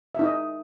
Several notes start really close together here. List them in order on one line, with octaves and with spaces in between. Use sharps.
E5 D#4 D#5